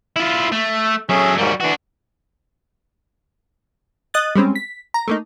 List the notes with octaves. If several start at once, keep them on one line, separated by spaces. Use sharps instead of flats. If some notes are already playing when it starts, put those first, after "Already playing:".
E4 F4
A3
F#3 C#4 G#4 A4 E5
D#2 G#2 G3 A#3 F#4
E3 D4 F#4
D#5 D#6 F#6 A6
G3 G#3 C4 C#4
B6
A#5
A3 A#3 D#4